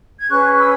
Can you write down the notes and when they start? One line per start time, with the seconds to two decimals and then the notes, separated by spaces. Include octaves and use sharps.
0.18 G#6
0.29 C#4 G#4 B4 C#6 F#6
0.57 B5 E6